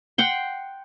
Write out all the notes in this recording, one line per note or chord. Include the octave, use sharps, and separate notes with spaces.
F#5 G5 C6